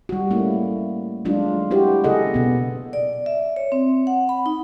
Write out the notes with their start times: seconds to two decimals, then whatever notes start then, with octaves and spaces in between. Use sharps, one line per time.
0.09 G3 F#4
0.31 A3 A#3 C#4 E4
1.25 F#3 G#3 D4 D#4 F4
1.71 E4 F#4 G4 C5
2.04 C#3 A#3 G#4 A4 D#5 F#5
2.34 B2 B3
2.93 D5
3.26 E5
3.56 C#5
3.72 C4
4.07 F#5
4.29 B5
4.46 D#4